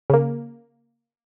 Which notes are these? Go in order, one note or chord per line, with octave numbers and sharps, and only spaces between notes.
C#3 A#3